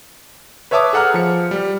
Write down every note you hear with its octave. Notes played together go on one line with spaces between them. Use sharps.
B4 C#5 E5 A5 D6 D#6
G#4 A4 F#5 A#5 F6
F3 C#7
G3